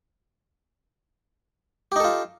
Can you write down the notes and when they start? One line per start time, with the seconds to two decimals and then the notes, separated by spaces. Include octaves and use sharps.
1.92 G4
1.96 D#4
2.00 A4
2.04 F4